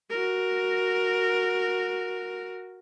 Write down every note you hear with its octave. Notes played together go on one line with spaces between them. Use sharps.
F#4 A#4